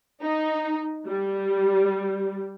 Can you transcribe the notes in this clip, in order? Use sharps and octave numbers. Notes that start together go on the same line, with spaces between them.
D#4
G3